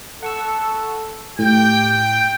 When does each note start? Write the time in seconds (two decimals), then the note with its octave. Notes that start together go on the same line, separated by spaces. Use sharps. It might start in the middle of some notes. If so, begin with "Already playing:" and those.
0.23 A4 F#5 C#6 E6
1.39 A2 G4 G5